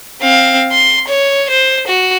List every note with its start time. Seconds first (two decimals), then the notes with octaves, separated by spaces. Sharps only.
0.22 C4 F5
0.72 C6
1.07 C#5
1.50 C5
1.87 F#4